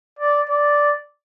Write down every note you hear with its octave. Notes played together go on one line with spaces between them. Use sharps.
D5
D5